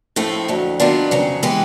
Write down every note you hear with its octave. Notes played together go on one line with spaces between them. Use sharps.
A2 F3 A3 C4 E4
F2 D3 F#3
D#3 F#3 B3 D4 F4
F2 C#3 F#3
E3 G#3 B3 E4 G4